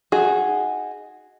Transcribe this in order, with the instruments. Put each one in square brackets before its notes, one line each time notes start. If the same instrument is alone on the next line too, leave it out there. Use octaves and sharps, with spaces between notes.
[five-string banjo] D#4 F#4 G#4